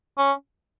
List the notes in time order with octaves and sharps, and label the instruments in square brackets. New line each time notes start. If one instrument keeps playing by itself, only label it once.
[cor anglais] C#4